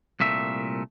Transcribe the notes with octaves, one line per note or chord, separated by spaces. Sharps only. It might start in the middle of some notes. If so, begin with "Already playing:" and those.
C2 A#2 A3 E5